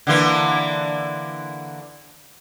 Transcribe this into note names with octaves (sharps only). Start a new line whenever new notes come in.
D3 E3 A#3